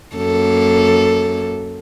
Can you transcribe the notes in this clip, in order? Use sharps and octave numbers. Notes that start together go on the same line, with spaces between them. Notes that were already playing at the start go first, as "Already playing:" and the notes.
F#2 A#3 A4